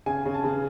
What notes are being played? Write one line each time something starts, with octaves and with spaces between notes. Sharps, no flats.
C#3 G#5
C#3
A5
C#3